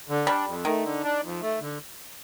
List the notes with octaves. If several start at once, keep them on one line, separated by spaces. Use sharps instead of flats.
D3
G3 D4
F2
D#3 A3
D3
D4
F2
A3
D3